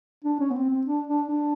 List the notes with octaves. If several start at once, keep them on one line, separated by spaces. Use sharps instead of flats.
D4
C#4
B3
C4
C4
D4
D4
D4